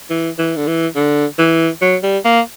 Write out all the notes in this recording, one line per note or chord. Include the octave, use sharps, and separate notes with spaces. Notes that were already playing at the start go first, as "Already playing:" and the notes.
E3
E3
D3
E3
D3
E3
F#3
G3
A#3